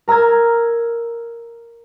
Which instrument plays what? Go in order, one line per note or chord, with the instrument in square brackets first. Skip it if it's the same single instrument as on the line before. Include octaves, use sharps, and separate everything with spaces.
[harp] A#4 A#5 E6 F6 G#6